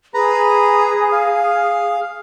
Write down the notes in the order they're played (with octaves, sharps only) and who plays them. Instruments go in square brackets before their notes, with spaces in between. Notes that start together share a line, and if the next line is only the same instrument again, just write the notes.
[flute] G#4 [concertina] B4 A#5
[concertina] F5